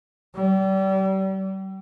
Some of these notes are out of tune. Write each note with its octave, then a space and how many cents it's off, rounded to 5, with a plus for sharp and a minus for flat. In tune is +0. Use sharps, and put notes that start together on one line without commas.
G3 -35